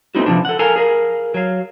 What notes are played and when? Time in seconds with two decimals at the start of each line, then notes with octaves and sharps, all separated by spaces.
0.15 A3 B3 C4 D#4 E4 F#4
0.26 C3 E3 F3 C4 D4
0.45 A4 F#5
0.59 A4 A#4 F5 G#5 A#5
0.76 G#4 A#4 F5
1.34 F#3 F5